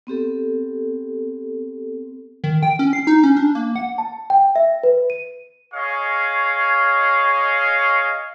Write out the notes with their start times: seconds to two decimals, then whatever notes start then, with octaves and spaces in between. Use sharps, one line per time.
0.07 B3 C4 G4 A4
2.44 D#3
2.63 G5
2.79 C#4
2.93 C7
3.07 D#4
3.23 C#4
3.37 D4
3.55 A#3
3.76 F#5
3.98 A5
4.30 G5
4.56 E5
4.83 B4
5.10 D#7
5.74 G#4 C#5 D#5 F5 C#6